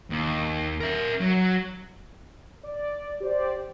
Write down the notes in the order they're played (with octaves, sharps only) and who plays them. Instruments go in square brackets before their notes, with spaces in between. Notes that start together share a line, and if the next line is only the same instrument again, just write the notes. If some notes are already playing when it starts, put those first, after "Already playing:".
[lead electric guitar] D#2
A#4 E5
F#3
[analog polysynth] D5
G4 C5 D5